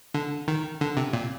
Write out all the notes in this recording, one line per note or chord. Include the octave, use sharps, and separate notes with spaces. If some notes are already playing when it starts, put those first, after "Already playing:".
D3
D#3
D3
C3
A#2